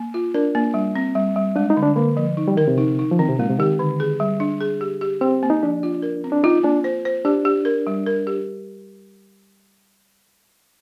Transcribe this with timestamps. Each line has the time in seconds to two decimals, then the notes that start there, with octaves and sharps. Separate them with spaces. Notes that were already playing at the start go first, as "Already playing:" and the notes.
Already playing: A#3
0.14 F4
0.34 D4 A#4
0.55 A#3
0.74 G3
0.96 C4
1.15 G3
1.36 G3
1.56 G#3 D4
1.70 D#4
1.77 D3
1.82 D4
1.96 D3 A#3
2.17 F3
2.37 D#4
2.48 G3
2.57 D#3 A#4
2.68 C3
2.78 D#4
2.99 D#4
3.11 F3
3.19 D#3 C4
3.29 C3
3.39 A#2 G#3
3.49 C3
3.59 D#3 G4
3.79 D3
4.00 G#4
4.20 G3
4.40 D4
4.61 G#4
4.81 G4
5.01 G4
5.21 C4 G4
5.43 A#3
5.50 D#4
5.63 F3 D4
5.83 F4
6.02 A#4
6.24 C4
6.32 D4
6.44 D#4 F4
6.63 A#3 D4
6.84 C5
7.05 C5
7.25 D4 G4
7.45 G4
7.65 A#4
7.87 G3
8.06 A#4
8.27 G4